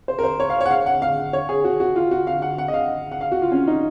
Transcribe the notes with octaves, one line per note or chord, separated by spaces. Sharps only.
C5
A#4
C5
C#5
F5
C#5
F#5
F5
F#5
F5
C#5
G#4
F#4
F#4
F4
F#4
F5
F#5
F#5
D#5
F5
F#5
F5
F#4
F4
C#4
D#4